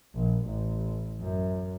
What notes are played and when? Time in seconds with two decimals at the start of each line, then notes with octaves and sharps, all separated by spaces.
0.15 A#1
0.45 A1
1.21 F#2